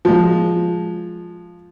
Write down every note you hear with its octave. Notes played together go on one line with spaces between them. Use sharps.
F3 G#3